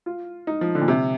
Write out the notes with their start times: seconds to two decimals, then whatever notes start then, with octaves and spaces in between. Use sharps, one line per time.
0.06 F4
0.47 D#4
0.61 F3
0.75 D3
0.81 A#2
0.88 C3